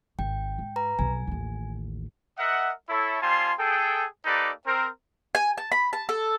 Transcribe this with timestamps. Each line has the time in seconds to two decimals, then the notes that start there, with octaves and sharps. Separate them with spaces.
0.19 G#1 G5
0.58 G#2
0.76 B4 A#5
0.99 B1 F2 G#5
1.27 A1 D#2
2.38 A#4 D#5 E5 F#5
2.89 E4 A4 C#5
3.21 G3 C4 F4 G#5 A5 C6
3.58 G#4 A4 G5
4.25 A#3 D#4 G4 A4 B4 D5
4.66 C4 A#4
5.35 G#5
5.58 A5
5.72 B5
5.93 A5
6.09 A4